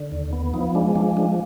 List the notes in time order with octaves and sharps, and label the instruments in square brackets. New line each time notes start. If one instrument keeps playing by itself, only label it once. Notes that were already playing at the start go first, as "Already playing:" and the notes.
Already playing: [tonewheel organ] D3
D#2
B3
F3 D#4
G#3 D4
F3 D4
G#3 D4